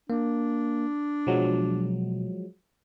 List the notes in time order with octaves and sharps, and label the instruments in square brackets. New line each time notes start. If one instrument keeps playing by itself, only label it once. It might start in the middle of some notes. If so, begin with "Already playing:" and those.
[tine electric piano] A#3 [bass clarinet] D4
[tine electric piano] B2 [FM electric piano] F3 F#3 G#3